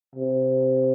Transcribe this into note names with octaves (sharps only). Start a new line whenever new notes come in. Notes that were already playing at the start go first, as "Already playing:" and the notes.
C3